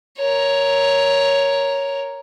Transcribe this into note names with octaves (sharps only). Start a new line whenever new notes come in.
A#4 C#5